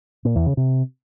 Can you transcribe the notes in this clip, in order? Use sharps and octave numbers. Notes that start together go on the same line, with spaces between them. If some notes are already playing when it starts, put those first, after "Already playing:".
A#2
E2
C#3
C3